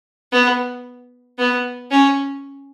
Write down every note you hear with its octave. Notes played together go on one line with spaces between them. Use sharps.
B3
B3
C#4